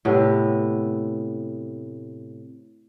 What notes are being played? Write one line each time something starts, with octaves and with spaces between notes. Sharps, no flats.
A2 C3 B3